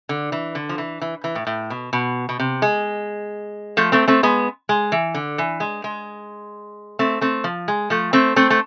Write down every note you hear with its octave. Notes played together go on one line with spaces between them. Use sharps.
D3
E3
D3
F3
E3
E3
E3
A2
A2
B2
B2
B2
C3
G#3
F3 A3
A3 C4
A3 C4
G#3 B3
G#3
E3
D3
E3
G#3
G#3
A3 C4
A3 C4
F3
G#3
F3 A3
A3 C4
A3 C4
A3